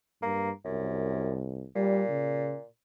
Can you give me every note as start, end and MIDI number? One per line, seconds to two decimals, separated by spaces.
0.22 0.52 43
0.22 0.50 58
0.65 1.65 36
0.65 1.35 42
1.75 2.65 46
1.75 2.03 55
2.10 2.55 49